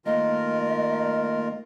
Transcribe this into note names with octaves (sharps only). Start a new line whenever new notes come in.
D#3 A3 A#3 F4 A#4 D#5